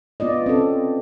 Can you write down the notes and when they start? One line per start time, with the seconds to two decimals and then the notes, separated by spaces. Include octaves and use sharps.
0.20 B3 F4 D5 D#5
0.46 C4 C#4 A4